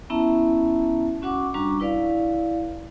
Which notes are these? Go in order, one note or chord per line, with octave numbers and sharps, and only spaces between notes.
B3 C#4 E4 E5 A5 A#5
C#4 F#4 F#5 C#6 D6
G3 D4 F#4 A#5 C#6 D6
E4 B4 D5 F5